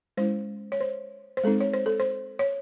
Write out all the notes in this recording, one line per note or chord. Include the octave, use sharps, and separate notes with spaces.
G#3 C#4 E4 C5
C#5
C5
C5
G#3 C4 D#4 A4
C#5
C5
A4
C5
C#5